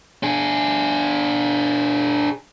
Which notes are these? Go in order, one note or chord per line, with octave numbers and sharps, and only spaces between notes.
D4 G#4